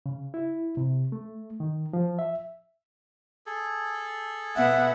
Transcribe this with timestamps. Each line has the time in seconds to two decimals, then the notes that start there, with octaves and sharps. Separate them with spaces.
0.06 C#3
0.34 E4
0.77 C3
1.12 A3
1.60 D#3
1.93 F3
2.19 E5
3.46 G#4 A4
4.56 B2 B3 E5 F#5